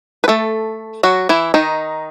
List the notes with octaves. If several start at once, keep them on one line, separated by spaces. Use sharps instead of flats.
B4
A3 A4
F#3 F#4
E3 E4
D#3 D#4